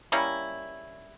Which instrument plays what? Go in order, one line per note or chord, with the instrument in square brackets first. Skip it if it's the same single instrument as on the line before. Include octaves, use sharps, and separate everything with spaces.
[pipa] G3 A#3 C#4 E4